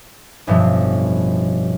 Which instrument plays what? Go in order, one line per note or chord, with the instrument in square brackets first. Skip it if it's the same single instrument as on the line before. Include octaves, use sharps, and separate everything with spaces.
[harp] A1 G2 B2 F3